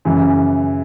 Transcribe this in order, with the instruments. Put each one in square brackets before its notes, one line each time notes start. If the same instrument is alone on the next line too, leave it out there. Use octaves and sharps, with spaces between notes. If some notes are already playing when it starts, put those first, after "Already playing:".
[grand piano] F#2 C#3 E3